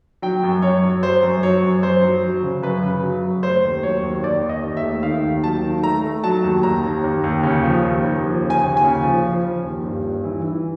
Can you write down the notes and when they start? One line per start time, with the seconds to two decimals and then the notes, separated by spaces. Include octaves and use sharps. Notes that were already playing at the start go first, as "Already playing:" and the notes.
0.22 F#3 G5
0.44 F#2
0.62 F#2 C#5
0.84 F#3
1.03 F#2 C5
1.23 F#2
1.43 F#3 C#5
1.63 F#2
1.82 F#2 C5
2.04 F#3
2.23 F#3
2.43 C#3
2.63 F#2 B4
2.83 C#3
3.03 F#3
3.24 F#2
3.43 A3 C5
3.63 D#2
3.83 F#3 C#5
4.03 D#2
4.23 D#2 D5
4.43 D#2
4.49 D#5
4.63 D#2
4.77 E5
4.83 A3
5.03 D#3 F5
5.24 D#2
5.43 F#3 A5
5.63 D#3
5.83 A3 A#5
6.04 A3
6.24 F#3 A5
6.44 D#2
6.63 D#2 A#5
6.83 D#2
7.04 D#2
7.24 D#2
7.43 C#3
7.64 F3
7.84 D#2
8.04 D#2
8.24 F3
8.43 C#3
8.50 G#5
8.63 D#2
8.77 G#5
8.84 C#3
9.03 F3
9.24 F3
9.44 F3
9.63 D#2
9.84 G2
10.04 G2
10.24 E3
10.44 E3